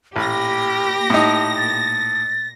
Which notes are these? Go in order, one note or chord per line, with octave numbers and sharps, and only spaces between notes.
A1 A#2 G4 B5 A#6
A2 D#4 A5
A6